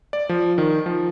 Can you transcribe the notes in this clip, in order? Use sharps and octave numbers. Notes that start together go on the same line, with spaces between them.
D5
F3
D#3
F3